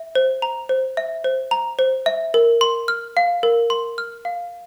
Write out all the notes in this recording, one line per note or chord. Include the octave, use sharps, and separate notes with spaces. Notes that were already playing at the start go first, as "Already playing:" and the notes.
Already playing: E5
C5
A#5
C5
E5
C5
A#5
C5
E5
A#4
C6
F6
F5
A#4
C6
F6
F5